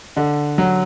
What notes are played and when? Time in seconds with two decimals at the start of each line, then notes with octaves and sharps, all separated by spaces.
0.16 D3
0.58 F#3